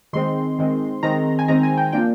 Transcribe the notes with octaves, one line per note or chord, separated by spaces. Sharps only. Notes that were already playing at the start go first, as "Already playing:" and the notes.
D#3 G#3 C4 C6
D#3 G#3 C4
D#3 G#3 C4 A#5
G#5
D#3 G#3 C4 A#5
G#5
G5
F3 A#3 D4 G5